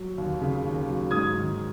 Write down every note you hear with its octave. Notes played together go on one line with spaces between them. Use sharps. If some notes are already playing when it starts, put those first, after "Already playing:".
Already playing: F#3
D#2
C#3
D#2
F#3
G#2 D#6 G#6
D#3